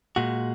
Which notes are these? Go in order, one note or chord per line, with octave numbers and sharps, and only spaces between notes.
A#2 G#3 F#4